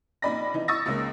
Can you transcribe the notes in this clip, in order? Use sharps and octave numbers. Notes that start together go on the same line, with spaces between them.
A#1 D#4 D5 B5 A#6
E3 D#4
C#6 D#6 E6 A6 A#6
C#2 C#3 G#3 A#3